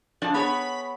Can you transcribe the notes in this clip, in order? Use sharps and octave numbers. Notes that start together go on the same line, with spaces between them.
F3 D4 D5
B3 G#4 C#5 B5